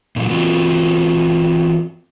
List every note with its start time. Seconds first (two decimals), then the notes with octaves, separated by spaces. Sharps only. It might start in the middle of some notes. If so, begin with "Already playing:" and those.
0.16 A#2 E3 F#3
0.30 E3 C4 F4 F#4